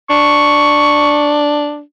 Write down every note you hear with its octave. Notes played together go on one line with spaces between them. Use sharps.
D4 C#6